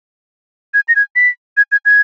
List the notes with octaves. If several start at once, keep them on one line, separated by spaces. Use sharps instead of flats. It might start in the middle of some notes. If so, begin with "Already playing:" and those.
G#6
A#6
G#6
B6
G#6
G#6
G#6